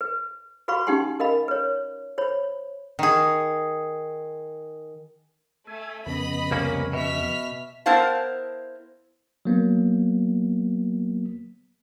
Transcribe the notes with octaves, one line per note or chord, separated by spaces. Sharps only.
B4
F#4 B4 F5 B5 C#6
C#4 D#4 G4 F#5 G#5 C6
A#4 D#5 F5 B5
B4 C#5
C5 C#5 B5
D#3 G#4
A3 E5 G#5
F2 C#3 B3 D#5 B5
C2 A#3 C#4
B2 E5 F6 B6
B3 E4 A#4 C5 F5 A5
F#3 A#3 B3